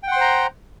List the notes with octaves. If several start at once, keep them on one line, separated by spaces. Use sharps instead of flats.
C5 F#5 G5 A#5 C6